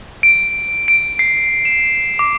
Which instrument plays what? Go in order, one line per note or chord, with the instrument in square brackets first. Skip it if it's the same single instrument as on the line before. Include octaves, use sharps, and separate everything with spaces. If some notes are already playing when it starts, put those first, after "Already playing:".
[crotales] D7
D7
C7
E7
D6